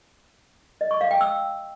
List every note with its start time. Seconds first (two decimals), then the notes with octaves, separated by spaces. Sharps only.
0.81 D#5
0.91 C#6
1.01 F5
1.11 G5
1.21 E6